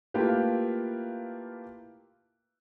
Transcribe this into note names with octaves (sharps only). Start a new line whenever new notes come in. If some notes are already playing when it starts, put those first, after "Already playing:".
A3 A#3 E4 F4 G4 B4